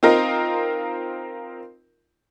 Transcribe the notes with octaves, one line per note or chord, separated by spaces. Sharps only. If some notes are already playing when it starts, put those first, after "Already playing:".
C4 D#4 F4 A#4